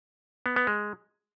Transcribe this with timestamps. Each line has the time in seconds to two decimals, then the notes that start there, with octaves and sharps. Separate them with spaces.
0.46 B3
0.56 B3
0.67 G#3